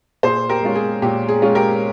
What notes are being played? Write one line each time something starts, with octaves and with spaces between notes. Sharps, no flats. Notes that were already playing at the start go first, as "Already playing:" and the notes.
A#2 G#4 C5
G4 A#4
G#3 C#4 F4
G#4
A#2 G4
G#4
G#3 C#4 F4
G4 A#4